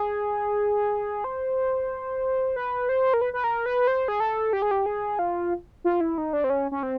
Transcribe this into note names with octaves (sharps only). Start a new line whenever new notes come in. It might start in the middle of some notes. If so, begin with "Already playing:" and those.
Already playing: G#4
C5
B4
C5
A#4
B4
B4
A#4
B4
C5
G#4
A4
G4
G#4
G4
G#4
F4
F4
E4
D#4
D4
C4
C#4
C#4
C4